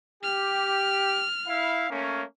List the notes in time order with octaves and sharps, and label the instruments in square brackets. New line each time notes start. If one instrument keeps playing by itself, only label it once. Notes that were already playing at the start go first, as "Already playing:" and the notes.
[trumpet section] G4 [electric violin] F6
[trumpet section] E4 F5
A3 A#3 C#4